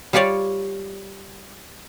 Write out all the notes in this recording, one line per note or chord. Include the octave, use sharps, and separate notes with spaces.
G3 F4 G4 C#5 D5